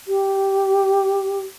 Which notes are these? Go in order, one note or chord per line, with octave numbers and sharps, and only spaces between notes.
G4